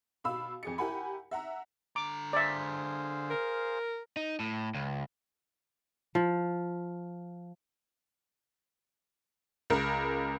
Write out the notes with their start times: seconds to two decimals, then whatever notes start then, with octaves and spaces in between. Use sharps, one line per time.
0.24 B2 F5 B5 E6
0.63 F2 G#4 C#7
0.78 E4 G4 A#4 F#5 G#5 B5
1.31 E5 F#5 A#5
1.96 D3 A#5 D6
2.33 G#4 C5 D5 E5 F5
3.30 A#4
4.17 D#4
4.40 A2
4.75 C#2
6.15 F3
9.70 C#2 A#4